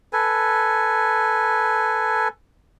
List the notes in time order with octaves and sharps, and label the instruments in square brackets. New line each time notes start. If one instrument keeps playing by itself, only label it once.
[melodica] A4 B4 G#5